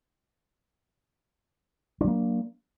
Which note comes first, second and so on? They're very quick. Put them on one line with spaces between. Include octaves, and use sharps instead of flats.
D4 F#3 A#3